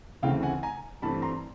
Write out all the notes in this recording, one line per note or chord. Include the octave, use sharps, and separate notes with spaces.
D2 C#3 E3 A3 C4 F5 G5
F#5 G#5
G#5 A#5
G2 E3 A3 C4 A5 B5
A#5 C6